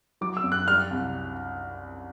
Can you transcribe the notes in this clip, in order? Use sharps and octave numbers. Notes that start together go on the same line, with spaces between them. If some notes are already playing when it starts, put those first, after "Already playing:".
F#3 D6
E6
F#2
F#6
G3 F6
C2